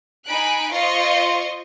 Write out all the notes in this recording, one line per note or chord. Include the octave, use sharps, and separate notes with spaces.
D#4 G#5 B5 F#6 D7
F4 C5 D#5 F5 C6 C#6